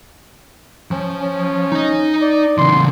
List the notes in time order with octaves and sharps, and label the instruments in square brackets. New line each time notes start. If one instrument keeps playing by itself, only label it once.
[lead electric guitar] F3 [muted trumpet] C#4
[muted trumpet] C#4
[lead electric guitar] D#4 D#5
[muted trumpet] D5
[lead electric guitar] C#3 E3 [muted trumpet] C6